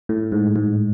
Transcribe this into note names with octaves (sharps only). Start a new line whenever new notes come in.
A2
G#2
G#2